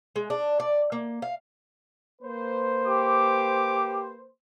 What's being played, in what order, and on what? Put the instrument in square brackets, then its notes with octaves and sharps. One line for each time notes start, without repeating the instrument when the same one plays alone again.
[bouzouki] G#3
D4
D5
A#3
F5
[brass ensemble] A#3 B4 C5
[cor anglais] G4 [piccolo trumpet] D6